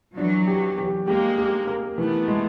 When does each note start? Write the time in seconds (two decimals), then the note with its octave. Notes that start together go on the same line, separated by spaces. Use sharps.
0.17 E3 F#3 D4
0.47 G4
0.78 G4
1.07 G#3 A#3 G4
1.38 G4
1.68 A#4
1.98 E3 A3 B3
2.28 G#3